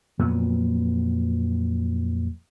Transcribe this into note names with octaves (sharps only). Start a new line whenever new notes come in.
F2 A#2 F#3 B3